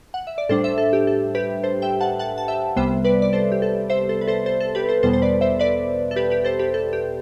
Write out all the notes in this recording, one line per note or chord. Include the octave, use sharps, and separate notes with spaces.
F#5
E5
D5
A2 G3 D4 A4 C5
C5 E5
A4
G4
A4
G4 B4
A4 C5
E5 G5
F#5 A5
F#5 A5
A5
E5 G5
C2 C3 G3 B3 C5 E5
B4 D5
D5
A4 C5
G4
A4
C5 E5
A4 C5
B4
A4 C5
A4 C5
A4
G4 B4
A4 C5
E2 B2 G3 B3 A4 C5
C5
B4 D5
C5 E5
B4 D5
A4
G4 B4
G4 B4
A4 C5
G4 B4
A4
G4